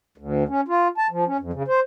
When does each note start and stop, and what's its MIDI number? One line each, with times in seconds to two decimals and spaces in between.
0.18 0.43 38
0.48 0.61 61
0.68 0.88 65
0.98 1.07 81
1.11 1.24 53
1.27 1.37 61
1.40 1.51 41
1.53 1.63 49
1.68 1.80 72